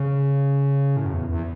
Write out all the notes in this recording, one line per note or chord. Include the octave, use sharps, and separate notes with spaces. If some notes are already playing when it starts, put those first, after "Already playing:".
Already playing: C#3
A2
F#2
E2
E2